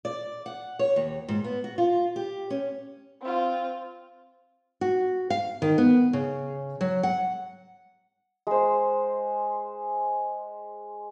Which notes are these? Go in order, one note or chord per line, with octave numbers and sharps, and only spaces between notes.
D5
F#5
C#5
D#2
G#2
B3
F#4
F4
G4
C#4
C4 F4
F#4
F5
D#3
B3
C#3
F#3
F#5
G#3 C5